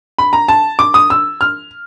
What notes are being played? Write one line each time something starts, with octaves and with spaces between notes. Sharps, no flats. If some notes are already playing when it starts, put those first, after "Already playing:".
B5
A#5
A5
D6
D#6
E6
F6